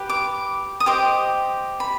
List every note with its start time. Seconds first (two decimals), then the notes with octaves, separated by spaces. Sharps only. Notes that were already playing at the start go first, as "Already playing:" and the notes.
Already playing: G4 B4
0.10 D6
0.80 D#6
0.86 G4 C5 D#5 D6
1.80 B5